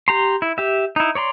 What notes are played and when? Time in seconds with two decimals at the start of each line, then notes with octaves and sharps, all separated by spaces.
0.08 G4 A#5 C6
0.42 E4
0.58 G4 E5
0.96 D#4 E4
1.15 C#5 D5 A#5 C6